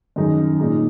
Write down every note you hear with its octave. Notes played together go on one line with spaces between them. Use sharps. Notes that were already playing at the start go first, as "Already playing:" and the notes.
F#2 D#3 G#3 D#4
A#2 G#3 D#4